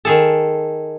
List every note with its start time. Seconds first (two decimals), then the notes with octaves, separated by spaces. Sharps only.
0.05 D#3 G#4 A4